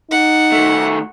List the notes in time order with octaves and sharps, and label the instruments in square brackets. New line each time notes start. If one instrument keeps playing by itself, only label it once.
[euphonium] D#4 [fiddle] F#5
[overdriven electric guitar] D#3 A3